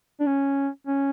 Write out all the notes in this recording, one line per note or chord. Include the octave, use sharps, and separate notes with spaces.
D4
C#4
C#4